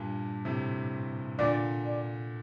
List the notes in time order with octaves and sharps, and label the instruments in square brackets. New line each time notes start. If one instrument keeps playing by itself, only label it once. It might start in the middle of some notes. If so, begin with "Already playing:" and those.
Already playing: [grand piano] G2 A#2
A2 C3
[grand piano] A#2 D3 [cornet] D5
[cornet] D5